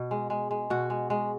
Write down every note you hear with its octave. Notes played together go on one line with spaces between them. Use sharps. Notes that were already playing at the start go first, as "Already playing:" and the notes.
Already playing: B2
G#3
G#3
G#3
B2 F#4
G#3
G#3